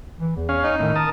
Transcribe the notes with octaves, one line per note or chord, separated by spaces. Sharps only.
E3
E2
C#4 F5
D#4
A2 D#3
A#4 A5 D#6